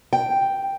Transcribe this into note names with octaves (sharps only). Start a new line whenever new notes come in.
G5